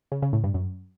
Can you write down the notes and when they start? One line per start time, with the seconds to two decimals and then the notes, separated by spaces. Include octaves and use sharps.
0.12 C#3
0.22 C#3
0.33 A2
0.44 G2
0.54 F#2